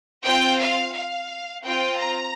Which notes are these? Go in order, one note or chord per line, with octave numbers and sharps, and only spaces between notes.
C4 F4 G5
F5
F5
C4 F4 G5
A#5